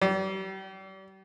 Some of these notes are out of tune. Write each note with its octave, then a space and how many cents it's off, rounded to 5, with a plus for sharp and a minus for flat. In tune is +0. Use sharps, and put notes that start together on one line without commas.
G3 -35